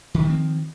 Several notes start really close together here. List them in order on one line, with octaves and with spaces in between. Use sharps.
D#3 A3 F3 C4